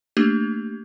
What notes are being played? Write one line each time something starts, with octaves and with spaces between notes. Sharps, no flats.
A3 A#3 D4 G4